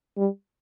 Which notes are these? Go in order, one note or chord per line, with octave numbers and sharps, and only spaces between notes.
G3